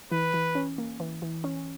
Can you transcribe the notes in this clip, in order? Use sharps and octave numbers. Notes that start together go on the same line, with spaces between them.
E3 B4
E3
C#4
A#3
E3
E3
C#4